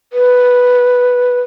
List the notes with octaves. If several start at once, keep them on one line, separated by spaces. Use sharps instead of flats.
B4